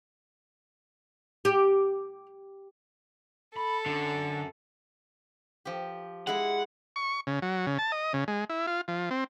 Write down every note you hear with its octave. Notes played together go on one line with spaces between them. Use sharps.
G4
A4 B5
F#2 D3
F3 G4
G#3 E4 F#5
C#6
C#3
F#3
C#3
A5
D#5
C#3
G#3
E4
F4
F3
C4